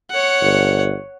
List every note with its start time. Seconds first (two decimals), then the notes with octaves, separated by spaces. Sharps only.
0.10 C#5 F#5
0.41 G1